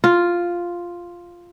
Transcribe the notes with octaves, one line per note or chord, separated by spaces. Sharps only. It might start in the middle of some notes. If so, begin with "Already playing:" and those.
F4